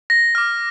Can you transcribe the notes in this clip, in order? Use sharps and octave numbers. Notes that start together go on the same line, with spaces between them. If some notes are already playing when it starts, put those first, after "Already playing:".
A#6
D6 F6